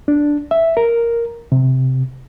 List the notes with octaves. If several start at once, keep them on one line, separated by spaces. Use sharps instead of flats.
D4
E5
A#4
C3